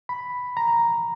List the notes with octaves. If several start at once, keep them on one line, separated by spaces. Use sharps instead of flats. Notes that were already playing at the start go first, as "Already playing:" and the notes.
B5
A#5